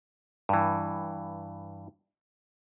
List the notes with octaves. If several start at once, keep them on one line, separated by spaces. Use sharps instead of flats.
G2 E3